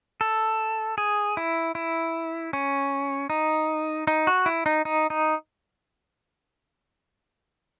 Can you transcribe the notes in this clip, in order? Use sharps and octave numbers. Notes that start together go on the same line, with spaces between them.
A4
G#4
E4
E4
C#4
D#4
D#4
F#4
E4
D#4
D#4
D#4